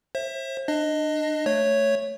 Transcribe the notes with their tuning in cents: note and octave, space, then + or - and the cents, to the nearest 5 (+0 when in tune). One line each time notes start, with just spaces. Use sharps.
C5 +40 E5 +0
D4 +30 D#5 +0
A3 +5 C#5 +0